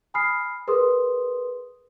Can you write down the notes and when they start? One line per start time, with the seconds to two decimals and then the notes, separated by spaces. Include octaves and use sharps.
0.14 G#5 B5 D#6 F6 C7
0.68 G#4 A#4 B4 C6 D#6